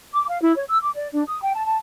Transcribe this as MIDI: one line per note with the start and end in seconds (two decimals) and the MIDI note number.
0.12 0.25 86
0.28 0.40 77
0.40 0.54 64
0.56 0.63 73
0.68 0.78 88
0.82 0.90 86
0.95 1.07 74
1.13 1.22 62
1.27 1.39 87
1.40 1.52 79
1.54 1.63 81
1.65 1.75 81